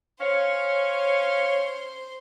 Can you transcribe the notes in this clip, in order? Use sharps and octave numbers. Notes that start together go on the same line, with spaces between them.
C#4 C5 C#5 F5